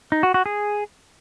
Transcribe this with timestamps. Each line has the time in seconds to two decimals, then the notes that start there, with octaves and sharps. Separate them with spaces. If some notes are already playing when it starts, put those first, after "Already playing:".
0.12 D#4
0.23 F#4
0.34 F#4
0.46 G#4